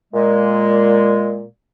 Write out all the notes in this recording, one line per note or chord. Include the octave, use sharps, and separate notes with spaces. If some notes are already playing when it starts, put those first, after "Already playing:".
A#2 G#3